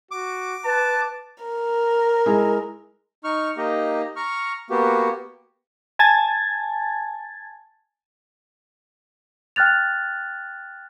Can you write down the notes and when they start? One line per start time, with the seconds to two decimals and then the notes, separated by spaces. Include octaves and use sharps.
0.11 F#4 D6
0.65 B4 A5
1.42 A#4
2.26 G#3 E4
3.24 D#4 C#6 F6
3.57 A#3 D#4 G4 D#5
4.16 A#5 C#6 F6
4.70 A#3 B3 F#4 G4
5.99 G#5 A5 G#6 A6
9.56 G5 F6 F#6 A6 F7